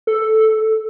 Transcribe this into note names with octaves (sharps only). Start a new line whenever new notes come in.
A4